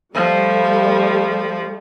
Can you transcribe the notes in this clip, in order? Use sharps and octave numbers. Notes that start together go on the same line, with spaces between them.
F3 G3 A3